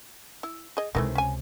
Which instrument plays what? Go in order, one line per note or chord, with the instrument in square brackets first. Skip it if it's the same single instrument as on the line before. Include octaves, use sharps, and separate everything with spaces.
[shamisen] E4
G#4 D#5
[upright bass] C#2 C3 [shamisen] D#3 E3 A3
[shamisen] C#4 G#5